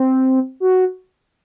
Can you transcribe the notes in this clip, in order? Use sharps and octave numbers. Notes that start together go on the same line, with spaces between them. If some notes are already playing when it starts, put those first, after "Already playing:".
Already playing: C4
F#4